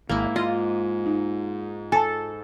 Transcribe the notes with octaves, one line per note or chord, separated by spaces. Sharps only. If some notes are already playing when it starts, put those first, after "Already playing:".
G#1 G#2 A#3 E4
F4 D#5
D#4
A4 G#5 A5